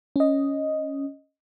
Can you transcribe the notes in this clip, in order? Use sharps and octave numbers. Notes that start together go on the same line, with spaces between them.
C#4 D#5